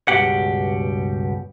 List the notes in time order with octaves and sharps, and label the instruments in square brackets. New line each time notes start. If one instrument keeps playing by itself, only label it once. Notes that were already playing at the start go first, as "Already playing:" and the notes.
[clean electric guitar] C#2 G2 B2 G4 F#5